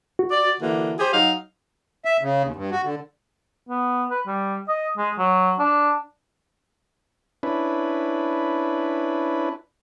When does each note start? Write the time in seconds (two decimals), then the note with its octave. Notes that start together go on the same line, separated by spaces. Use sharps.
0.19 F#4
0.31 D5
0.60 D3 E3 A#3
0.99 G4 G#4 C5
1.13 F#3 D#4 F5
2.05 E5
2.21 C#3
2.45 D#2
2.56 G2
2.71 F#4
2.84 D3
3.69 B3
4.10 B4
4.27 G3
4.68 D#5
4.97 G#3
5.18 F#3
5.59 D4
7.43 C#4 D4 E4 B4